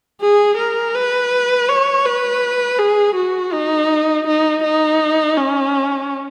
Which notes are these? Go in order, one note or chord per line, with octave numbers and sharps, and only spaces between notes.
G#4
A#4
B4
C#5
B4
G#4
F#4
D#4
D#4
D#4
C#4